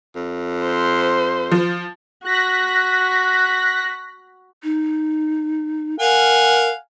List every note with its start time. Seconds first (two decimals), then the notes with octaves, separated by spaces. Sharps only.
0.16 F2
0.65 C5
1.51 F3
2.25 F#4 F#6 A#6 B6
4.63 D#4
5.99 A#4 F5 F#5 G#5